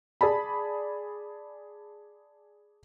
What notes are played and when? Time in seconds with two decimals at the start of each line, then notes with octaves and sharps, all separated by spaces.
0.21 G#4 D5 A5 B5